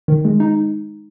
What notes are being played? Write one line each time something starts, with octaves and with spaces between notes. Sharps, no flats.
D#3
G#3
D#4